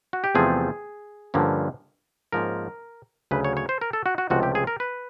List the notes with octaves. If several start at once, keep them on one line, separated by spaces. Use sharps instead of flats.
F#4
G4
E2 C3 F3 A3 C4 G#4
G2 D3 F3 A#3 C#4
G#2 F3 A#3 C#4 A#4
D2 C#3 F#3 B4
C#5
C#5
C5
A#4
A4
F#4
F#4
C#2 C3 F3 A3 F#4
G4
G#4
A#4
B4